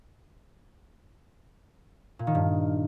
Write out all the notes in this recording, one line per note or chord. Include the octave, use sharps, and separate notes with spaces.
A#2
D#3
G2